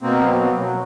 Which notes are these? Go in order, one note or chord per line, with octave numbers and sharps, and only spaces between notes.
B2 A#3 C4
F#3
F#3
F#3